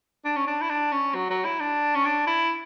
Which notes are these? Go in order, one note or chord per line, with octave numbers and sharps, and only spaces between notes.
D4
C#4
D4
E4
D4
C#4
F#3
F#3
E4
D4
C#4
D4
E4